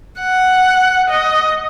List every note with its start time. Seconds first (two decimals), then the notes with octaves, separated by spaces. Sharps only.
0.20 F#5
1.09 D#5